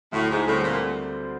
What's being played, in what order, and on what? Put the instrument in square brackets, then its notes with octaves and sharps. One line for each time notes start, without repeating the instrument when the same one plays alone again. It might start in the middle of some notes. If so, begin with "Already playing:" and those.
[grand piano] D2 [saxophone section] A2
[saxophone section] G#2
[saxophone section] A2 [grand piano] D3 G3 C4
[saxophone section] A#2